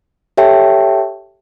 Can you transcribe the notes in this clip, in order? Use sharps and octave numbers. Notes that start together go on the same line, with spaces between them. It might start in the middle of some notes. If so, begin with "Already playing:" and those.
G4 A4 C#5 E5 G5 A5